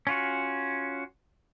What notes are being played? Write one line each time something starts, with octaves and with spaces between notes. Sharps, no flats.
C#4 F4 F#4